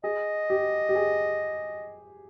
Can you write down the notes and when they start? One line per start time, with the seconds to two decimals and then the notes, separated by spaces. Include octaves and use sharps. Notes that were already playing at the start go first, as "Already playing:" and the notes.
0.04 G#4 D#5
0.50 G4
0.89 G4
0.96 G#4